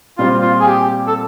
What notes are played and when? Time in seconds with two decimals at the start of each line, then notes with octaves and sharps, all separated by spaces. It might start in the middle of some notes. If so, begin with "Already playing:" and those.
0.18 A#2 G3 C4 F4
0.42 F4
0.60 G#4
0.66 G4
1.07 A4